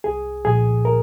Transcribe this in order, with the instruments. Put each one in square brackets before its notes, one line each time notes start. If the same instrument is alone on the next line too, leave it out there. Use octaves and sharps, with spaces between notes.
[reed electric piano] C2 G#4
A#2 F3 G#4
A#4